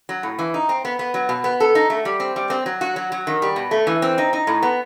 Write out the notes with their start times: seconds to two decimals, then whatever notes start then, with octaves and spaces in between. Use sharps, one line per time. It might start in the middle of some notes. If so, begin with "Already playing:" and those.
0.09 F#3
0.23 A2
0.39 E3
0.54 D#4
0.69 C4
0.85 B3
0.99 B3
1.14 F#3
1.29 B2
1.44 B3
1.60 A4
1.75 D#4
1.90 A3
2.05 G3
2.20 C4
2.36 G3
2.50 C4
2.66 F#3
2.81 F#4
2.96 F#3
3.12 F#3
3.27 D#3
3.42 G3
3.56 B2
3.71 A3
3.87 E3
4.02 C4
4.18 D#4
4.33 D#4
4.47 A2
4.63 B3